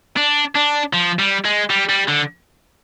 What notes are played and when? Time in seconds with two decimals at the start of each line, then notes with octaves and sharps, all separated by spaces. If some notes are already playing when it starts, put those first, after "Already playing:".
0.16 D4
0.55 D4
0.93 F3
1.19 G3
1.45 G#3
1.70 G3
1.89 G3
2.08 D3